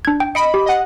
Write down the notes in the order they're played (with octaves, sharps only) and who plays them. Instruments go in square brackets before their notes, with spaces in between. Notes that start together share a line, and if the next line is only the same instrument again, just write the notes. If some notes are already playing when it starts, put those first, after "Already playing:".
[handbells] D4 G#6
G5
[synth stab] D#5 B5 [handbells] C#7 D7
[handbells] G4
[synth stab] D#5 F#5